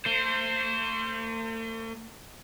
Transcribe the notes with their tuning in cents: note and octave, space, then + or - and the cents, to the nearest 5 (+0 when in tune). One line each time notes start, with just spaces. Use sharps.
A3 +45 C5 +0